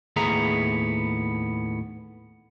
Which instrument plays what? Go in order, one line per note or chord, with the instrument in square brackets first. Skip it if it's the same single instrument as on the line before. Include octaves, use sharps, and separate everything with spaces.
[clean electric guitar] D#2 A2 B3 G#4 E5 A#5